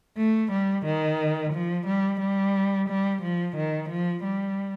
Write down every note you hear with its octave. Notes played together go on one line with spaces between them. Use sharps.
A3
G3
D#3
F3
G3
G3
G3
F3
D#3
F3
G3